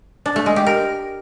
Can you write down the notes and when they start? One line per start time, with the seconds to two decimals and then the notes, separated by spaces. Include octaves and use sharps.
0.26 D4
0.36 A3
0.46 G#3
0.56 G4
0.67 A#4